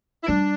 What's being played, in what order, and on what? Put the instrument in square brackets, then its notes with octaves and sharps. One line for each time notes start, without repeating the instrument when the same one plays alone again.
[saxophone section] E4
[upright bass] G3 [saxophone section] D4